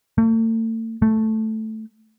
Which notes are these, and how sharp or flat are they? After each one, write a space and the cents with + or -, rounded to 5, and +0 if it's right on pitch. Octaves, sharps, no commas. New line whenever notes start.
A3 +40
A3 +0